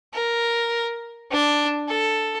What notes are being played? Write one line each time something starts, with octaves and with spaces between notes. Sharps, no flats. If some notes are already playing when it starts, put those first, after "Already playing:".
A#4
D4
A4